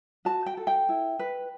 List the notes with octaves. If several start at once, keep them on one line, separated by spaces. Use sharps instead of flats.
F#4 A5
G5
A4
G5
E4
B4